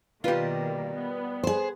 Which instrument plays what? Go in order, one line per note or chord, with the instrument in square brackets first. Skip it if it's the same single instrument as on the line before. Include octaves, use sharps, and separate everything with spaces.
[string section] B2 D#3 A#3 [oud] G3 B4 [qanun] F4 G4
[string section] B3
[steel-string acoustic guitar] G#4 C5